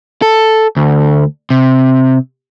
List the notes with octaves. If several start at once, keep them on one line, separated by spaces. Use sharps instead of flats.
A4
D2
C3